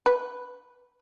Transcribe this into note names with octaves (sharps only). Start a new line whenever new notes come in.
B4